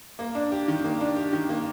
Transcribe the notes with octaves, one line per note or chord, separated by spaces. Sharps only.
A#3
D4
G4
D#3
A#3
D4
G4
D#3
A#3